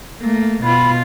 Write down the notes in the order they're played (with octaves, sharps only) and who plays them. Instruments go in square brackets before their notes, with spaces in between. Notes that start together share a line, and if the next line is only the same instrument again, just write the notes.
[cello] A3 A#3
[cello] B2 F4 [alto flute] B5